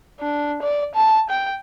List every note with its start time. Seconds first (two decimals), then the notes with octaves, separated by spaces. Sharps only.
0.20 D4
0.63 D5
0.95 A5
1.30 G5